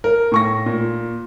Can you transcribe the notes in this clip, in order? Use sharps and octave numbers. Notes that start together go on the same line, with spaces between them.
A#4
A2 C#6 A#6
A#2